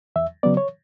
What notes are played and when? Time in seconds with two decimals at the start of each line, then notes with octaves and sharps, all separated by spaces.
0.16 E2 E5
0.43 C#3 F#3 B3 D5
0.57 C#5